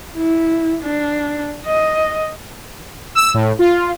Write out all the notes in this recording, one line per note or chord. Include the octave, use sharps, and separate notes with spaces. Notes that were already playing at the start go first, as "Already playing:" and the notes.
E4
D4
D#5
E6
A2
F4